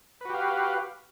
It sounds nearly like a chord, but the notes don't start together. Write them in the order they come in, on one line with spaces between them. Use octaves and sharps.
B4 F#4 G4 F5